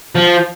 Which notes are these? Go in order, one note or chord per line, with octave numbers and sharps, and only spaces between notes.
F3